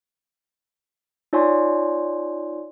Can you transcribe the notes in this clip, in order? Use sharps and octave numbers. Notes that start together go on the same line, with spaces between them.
D#4 F4 C#5 D5 G#5 C6